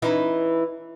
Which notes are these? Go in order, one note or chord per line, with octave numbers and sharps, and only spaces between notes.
E3 C#4 D#4